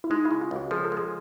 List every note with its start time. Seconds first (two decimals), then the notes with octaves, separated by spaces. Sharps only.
0.04 E4
0.10 G#3 D#4
0.25 E4
0.31 C#3
0.41 F4
0.51 C#2 F#4
0.71 F3 G#4
0.85 A4
0.92 G#3 G#4